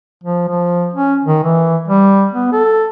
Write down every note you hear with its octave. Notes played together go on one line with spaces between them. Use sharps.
F3
F3
C#4
D#3
E3
G3
B3
A4